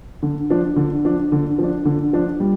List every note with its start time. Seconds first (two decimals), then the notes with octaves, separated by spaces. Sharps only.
0.23 D3
0.50 F3 D4
0.76 D3
1.05 F3 D4
1.32 D3
1.58 F3 D4
1.85 D3
2.13 F3 D4
2.40 G3